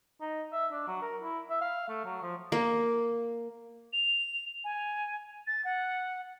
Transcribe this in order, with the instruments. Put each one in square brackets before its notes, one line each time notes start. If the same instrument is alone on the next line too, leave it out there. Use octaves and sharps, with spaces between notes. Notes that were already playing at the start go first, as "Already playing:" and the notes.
[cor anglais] D#4
E5
D4
F#3
A#4
E4
E5
F5
A3
F#3
F3
[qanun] A#3
[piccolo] F7
G#5
A6
F#5